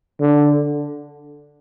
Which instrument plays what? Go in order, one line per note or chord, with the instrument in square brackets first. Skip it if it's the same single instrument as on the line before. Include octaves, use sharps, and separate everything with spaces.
[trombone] D3